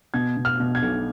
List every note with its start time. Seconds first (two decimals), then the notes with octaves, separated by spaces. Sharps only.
0.14 B2 G#6
0.37 B2
0.45 F6
0.60 B2
0.75 G#6
0.83 B1